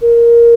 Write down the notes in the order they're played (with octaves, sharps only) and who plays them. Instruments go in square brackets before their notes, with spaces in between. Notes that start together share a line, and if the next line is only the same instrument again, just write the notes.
[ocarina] A#4